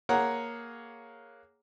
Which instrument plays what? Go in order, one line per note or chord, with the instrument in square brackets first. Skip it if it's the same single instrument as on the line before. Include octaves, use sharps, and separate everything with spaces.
[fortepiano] A#3 G#4 A#4 C#5 F#5